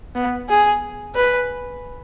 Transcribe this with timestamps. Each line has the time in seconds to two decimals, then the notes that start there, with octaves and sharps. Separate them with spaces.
0.15 B3
0.49 G#4
1.15 B4